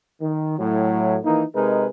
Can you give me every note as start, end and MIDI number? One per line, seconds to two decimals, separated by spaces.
0.21 0.56 51
0.59 1.18 45
0.59 1.18 54
1.24 1.43 51
1.24 1.43 52
1.24 1.43 58
1.24 1.43 63
1.55 1.87 48
1.55 1.87 56
1.55 1.87 63
1.55 1.87 68
1.55 1.87 70
1.55 1.87 71